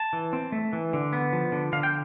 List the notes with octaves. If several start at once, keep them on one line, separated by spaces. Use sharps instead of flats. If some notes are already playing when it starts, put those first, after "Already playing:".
Already playing: A5
E3
C4
A3
E3
D3
B3
F3
D3
D3 F5
G5